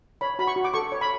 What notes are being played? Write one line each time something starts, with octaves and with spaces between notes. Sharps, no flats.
C#5 B5
F#4 B5
C#6
F#4
D6
A4 C#6
C#5
B5